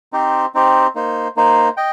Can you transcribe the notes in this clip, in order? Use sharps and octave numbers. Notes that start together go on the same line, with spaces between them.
C4 D#4 G4 C5
C4 D#4 G4 C5
A#3 D#4 C5
A#3 D#4 C5
D#5 G5